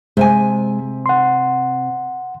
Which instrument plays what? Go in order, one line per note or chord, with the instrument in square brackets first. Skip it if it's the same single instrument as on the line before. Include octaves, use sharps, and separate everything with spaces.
[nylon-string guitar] C3 E5 G#5 [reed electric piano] G#3
[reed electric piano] F#5 C6